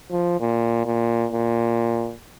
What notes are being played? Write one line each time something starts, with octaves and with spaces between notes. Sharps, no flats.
F3
A#2
A#2
A#2